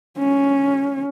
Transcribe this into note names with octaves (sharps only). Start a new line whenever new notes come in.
C#4